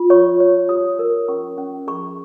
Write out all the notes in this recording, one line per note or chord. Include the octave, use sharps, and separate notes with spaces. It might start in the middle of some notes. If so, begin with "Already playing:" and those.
Already playing: F4
C#5 C#6
C#5
G4 D#6
A#4
C#4 C#6
C#4
G#4 C#6